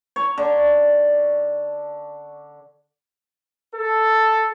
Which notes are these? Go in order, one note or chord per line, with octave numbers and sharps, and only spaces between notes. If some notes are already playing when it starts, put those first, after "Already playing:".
C#5
D3
A4